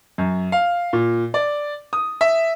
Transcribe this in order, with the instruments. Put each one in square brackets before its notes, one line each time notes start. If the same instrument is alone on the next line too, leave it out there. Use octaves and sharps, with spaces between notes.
[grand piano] F#2
F5
A#2
D5
D#6
E5